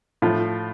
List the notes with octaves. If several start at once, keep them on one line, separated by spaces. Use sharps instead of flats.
A2 F3 F4